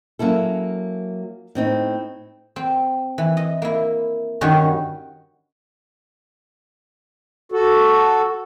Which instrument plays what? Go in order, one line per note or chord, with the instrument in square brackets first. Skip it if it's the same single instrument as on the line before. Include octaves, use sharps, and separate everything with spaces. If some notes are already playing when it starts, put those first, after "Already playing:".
[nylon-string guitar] F#3 A#3 C#4 E4 A4
A2 C4 D#4
[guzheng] C4
E3
D#5
A#3 E4
G2 D#3 G3 C#4 F#4
[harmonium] F#4 A4